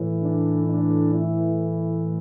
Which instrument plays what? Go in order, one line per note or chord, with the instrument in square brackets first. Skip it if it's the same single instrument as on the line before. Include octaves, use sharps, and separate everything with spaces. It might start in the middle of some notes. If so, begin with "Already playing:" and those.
Already playing: [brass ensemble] A2 E3
D4
D4
E4